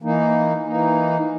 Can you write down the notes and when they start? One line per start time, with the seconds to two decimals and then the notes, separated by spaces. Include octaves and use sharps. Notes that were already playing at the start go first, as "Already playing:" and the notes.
0.02 E3 A#3 D#4
0.66 E3 A#3 D#4